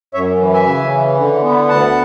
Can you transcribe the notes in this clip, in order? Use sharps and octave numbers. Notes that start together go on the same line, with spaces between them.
F#2 C#5 E5
E3
E5 G#5
C#3
E3
D3
B3
D2 F#5 A5